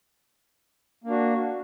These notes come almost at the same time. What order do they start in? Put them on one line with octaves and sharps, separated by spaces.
A#3 D4 F#4